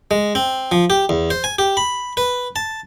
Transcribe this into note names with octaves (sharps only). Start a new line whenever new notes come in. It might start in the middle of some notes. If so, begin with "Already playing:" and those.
G#3
C4
F3
G4
E2
C5
G#5
G4
B5
B4
A5